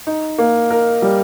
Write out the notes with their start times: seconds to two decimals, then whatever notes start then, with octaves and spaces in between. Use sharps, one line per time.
0.07 D#4
0.38 A#3
0.71 A#4
1.02 G3